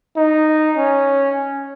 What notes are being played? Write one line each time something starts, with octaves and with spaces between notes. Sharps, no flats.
D#4
C#4